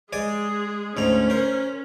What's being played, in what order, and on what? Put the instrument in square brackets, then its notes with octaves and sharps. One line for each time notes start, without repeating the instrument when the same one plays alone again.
[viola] G#3 G#4 [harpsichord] D5 D#5 G#5
[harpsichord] D2 G#2 A#5 [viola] C#4
[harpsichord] A#4 C5